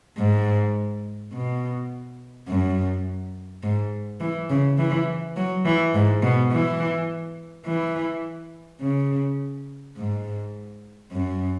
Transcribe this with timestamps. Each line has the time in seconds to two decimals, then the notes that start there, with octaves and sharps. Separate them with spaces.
0.18 G#2
1.33 B2
2.48 F#2
3.63 G#2
4.20 E3
4.50 C#3
4.78 E3
5.36 F#3
5.65 E3
5.94 G#2
6.23 B2
6.52 E3
7.66 E3
8.81 C#3
9.97 G#2
11.12 F#2